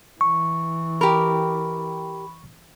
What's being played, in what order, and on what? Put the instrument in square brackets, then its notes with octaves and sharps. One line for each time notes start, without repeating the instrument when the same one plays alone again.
[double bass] E3 [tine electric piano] C#6
[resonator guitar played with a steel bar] G4 A#4 [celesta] B5